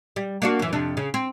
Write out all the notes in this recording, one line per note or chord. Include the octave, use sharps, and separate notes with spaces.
G3
A#3 D4 F#4
F#2 E3
F2 C3 D4
C#3
C4